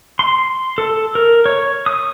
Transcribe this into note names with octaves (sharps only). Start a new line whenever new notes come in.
C6
A4
A#4
C#5
D#6